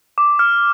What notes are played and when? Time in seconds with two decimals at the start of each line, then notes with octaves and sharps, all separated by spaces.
0.18 D6
0.39 F6